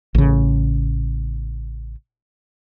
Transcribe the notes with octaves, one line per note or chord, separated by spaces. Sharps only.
A1 C#3